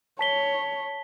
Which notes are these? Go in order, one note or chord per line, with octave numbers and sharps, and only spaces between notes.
C#5 A5 B6 G7